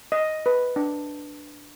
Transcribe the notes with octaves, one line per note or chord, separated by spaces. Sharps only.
D#5
B4
D4